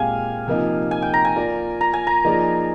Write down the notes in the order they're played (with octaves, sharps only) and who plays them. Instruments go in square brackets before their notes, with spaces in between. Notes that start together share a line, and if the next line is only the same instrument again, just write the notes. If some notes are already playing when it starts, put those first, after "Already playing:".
Already playing: [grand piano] A#2 G#3 C4 G4 [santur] F5 G#5
[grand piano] C3 F3 A#3 D#4
[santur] G#5
G5
A#5
G#5
[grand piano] A#3 F4 A#4 D5
[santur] A#5
G#5
A#5
[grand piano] F3 A#3 D#4 G#4 D5